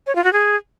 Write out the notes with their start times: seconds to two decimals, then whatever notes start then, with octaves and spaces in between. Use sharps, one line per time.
0.07 C#5
0.15 F4
0.24 F#4
0.33 G#4